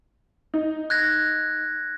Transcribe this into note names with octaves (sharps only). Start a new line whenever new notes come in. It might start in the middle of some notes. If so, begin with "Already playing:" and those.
D#4
F#6 G#6 A#6